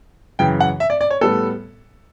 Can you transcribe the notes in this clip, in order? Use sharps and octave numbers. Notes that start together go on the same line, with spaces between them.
F#2 C#3 E3 G5
F#5
E5
D5
D5
C#5
A2 G3 B3 A4